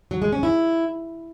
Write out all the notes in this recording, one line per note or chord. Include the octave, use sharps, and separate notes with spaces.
F#3
G#3
C#4
E4